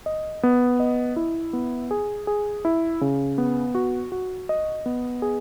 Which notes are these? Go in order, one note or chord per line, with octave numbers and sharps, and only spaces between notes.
D#5
B3
D#5
E4
B3
G#4
G#4
E4
C#3
B3
F#4
F#4
D#5
B3
G#4